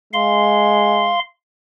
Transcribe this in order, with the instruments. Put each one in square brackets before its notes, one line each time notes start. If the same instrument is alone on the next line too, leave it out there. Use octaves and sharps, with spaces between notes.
[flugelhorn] G#3 [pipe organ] F5 C6